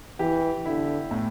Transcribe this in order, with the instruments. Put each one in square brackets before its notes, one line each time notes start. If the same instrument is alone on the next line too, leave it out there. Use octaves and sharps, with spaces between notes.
[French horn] E3 [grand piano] G4
[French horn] D3 [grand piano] E4
[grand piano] A2